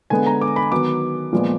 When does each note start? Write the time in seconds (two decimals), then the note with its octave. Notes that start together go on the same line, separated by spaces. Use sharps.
0.10 D3 G#3 B3 G#5
0.26 A#5
0.41 D6
0.56 B5
0.71 D#3 F#3 B3 D6
1.33 A#2 F3 G#3 B3